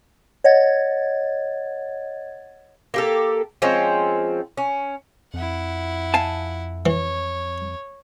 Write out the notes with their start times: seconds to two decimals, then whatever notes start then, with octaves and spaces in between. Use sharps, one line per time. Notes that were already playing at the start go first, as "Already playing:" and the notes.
0.44 C#5 D#5 F#5 G#6 A6
2.94 A#3 G4 A4
3.62 F3 G#3 C4 C#4
4.57 C#4
5.34 F2 E4 F#5
6.14 F5 G#5 A5
6.86 E3 C#5